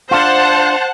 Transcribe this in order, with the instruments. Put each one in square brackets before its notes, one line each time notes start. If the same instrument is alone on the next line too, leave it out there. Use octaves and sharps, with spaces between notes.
[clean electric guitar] D4 F4 [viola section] C5 F#5 A5